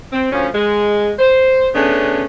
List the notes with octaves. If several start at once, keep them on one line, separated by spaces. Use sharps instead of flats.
C4
D2 F3 C#4
G#3
C5
C#3 A3 B3 C#4 D4